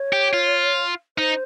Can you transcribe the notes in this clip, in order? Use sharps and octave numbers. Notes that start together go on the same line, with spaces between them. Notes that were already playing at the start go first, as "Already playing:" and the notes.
Already playing: C#5
G4
F4
D#4 C5